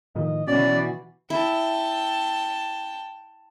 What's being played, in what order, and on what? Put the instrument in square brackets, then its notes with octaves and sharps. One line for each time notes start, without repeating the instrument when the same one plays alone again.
[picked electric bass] A2 D#3 F3 [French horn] D#5
[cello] B2 E3 [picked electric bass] C#4 [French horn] F#4 [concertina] D5
[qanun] E4 [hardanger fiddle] G5 A5